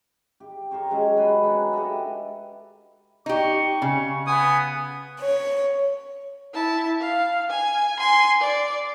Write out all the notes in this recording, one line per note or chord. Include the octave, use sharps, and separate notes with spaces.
G4
G4 A#4 C5 C#5
F#3 G#3 C#4 G#4
B3 B4 C5 B5
D4 D#4
G4 A4 D#5 E5
D#4 G4 C#6
C#3
B3 G#5 D#6
C#5
E4 A5
F5
G#5
G#5 C6
D5